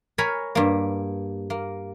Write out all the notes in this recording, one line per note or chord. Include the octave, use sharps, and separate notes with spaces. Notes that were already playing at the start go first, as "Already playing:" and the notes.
A#4 C#5 G#5 A#5 B5
G2 A#3
A#3